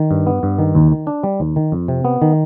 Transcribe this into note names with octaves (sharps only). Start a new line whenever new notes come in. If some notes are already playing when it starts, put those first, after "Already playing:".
Already playing: D#3
G2
B3
G2
D#3
D#2
D#3
D4
G3
D#2
D#3
F2
C3
B3
D#3